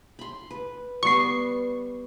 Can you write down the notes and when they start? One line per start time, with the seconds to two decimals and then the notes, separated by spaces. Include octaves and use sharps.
0.19 B5 C6
0.51 B4
1.03 G3 B3 C#6 C7